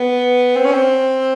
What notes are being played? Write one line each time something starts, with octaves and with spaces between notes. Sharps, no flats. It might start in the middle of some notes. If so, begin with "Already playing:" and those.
Already playing: B3
C4
C#4
C4